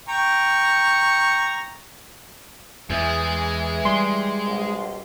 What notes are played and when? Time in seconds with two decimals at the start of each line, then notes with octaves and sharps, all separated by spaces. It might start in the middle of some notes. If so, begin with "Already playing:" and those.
0.09 G5 A#5 C#6
2.90 E2 E3 G#3 G#4
3.85 G3 C6
4.45 A#1 B2